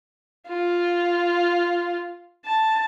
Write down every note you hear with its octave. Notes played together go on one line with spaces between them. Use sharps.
F4
A5